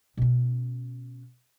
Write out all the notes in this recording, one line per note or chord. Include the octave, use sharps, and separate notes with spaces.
B2 C#4